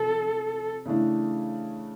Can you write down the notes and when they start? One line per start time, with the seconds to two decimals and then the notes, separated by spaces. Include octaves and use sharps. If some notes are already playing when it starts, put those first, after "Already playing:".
Already playing: C3 A4
0.86 C#3 E3 A3 D4